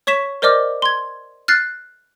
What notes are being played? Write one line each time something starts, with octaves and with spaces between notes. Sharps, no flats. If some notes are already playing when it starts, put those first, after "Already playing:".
C#5 C#6 B6 E7
A#4 C5 D5 D#5 D6 F6
C6 G#6
F6 F#6 A6 C7